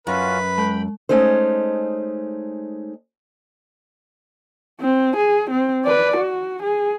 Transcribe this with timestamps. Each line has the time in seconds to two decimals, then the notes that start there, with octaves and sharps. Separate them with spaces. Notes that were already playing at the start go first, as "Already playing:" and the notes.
0.07 F#2 C#4 F4 F#4 B4
0.58 G#3 G5 B5
1.09 G#3 A3 C#4 D#4 C5
4.81 C4
5.16 G#4
5.50 C4
5.85 B4 D5
6.16 F#4
6.63 G#4